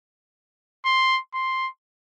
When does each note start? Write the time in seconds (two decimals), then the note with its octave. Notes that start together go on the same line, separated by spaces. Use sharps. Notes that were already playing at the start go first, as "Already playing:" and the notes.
0.85 C6
1.34 C6